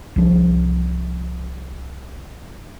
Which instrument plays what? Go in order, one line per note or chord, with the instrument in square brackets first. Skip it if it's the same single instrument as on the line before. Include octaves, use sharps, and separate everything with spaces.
[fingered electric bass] C2 F3